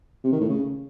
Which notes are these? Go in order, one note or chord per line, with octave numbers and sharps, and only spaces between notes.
C3
D#3
A2
C#3